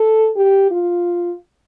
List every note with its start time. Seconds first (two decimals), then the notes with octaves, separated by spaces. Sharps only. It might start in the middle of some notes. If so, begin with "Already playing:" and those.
Already playing: A4
0.36 G4
0.71 F4